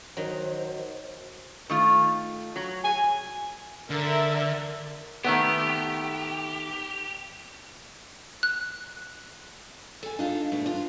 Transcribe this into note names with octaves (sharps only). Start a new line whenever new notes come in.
D#3 F#3 C5
D#3 A3 F4
F#3
G#5
D3 A#4 E5
D#3 A3 B3 G4
F#6
A4 G#5
D4 D#4 F4 A4
E2 B2 A3
F4